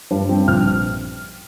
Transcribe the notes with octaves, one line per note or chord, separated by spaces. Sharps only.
G2
C4
A#1 F6